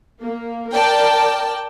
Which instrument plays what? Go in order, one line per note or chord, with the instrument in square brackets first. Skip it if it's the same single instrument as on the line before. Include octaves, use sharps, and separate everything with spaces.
[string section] A#3
A#4 D5 G5 A5